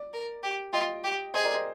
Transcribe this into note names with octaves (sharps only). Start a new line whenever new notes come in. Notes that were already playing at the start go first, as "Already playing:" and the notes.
Already playing: D5
A#4
G4
F4 D#5 G5
G4
G#4 C5 D#5
A#4 D5
C5 D#5